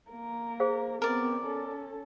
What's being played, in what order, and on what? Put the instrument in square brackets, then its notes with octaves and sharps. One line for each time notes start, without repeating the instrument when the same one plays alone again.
[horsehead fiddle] A#3 A#4
[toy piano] G#4 C5 F5
[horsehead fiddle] B3 C4 [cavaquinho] A#4 D5
[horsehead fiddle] C#4 A4